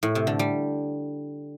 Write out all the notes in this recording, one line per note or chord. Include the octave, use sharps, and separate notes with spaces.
A2
C3
D3
G3